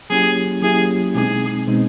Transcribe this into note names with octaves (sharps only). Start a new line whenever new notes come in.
F#3 A#3 C#4 E4 G4 G#4
F#3 A#3 C#4 E4 G4 G#4
B2 G#3 C4 D#4 G#4
B2 G#3 C4 D#4